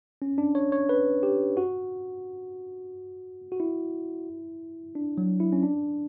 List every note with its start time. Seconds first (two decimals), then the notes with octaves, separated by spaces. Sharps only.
0.22 C#4
0.38 D4
0.55 C#5
0.72 C#5
0.89 B4
1.23 G4
1.57 F#4
3.52 F#4
3.60 E4
4.95 D4
5.18 F#3
5.40 E4
5.53 C#4
5.63 D4